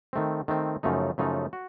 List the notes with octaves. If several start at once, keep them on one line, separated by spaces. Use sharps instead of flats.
D#3 A3 C4
D#3 A3 C4
F#2 C#3 F3 A3 D#4
F#2 C#3 F3 A3 D#4
F#4